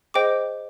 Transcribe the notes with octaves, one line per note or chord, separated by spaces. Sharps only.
G#4 C5 D#5 G5 D6